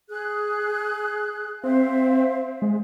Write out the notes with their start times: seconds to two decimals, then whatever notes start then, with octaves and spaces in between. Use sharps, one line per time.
0.09 G#4 F#6
1.64 C4 C5 E5 F5
2.62 G#3